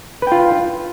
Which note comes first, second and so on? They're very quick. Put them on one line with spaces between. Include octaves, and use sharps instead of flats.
B4 G5 F4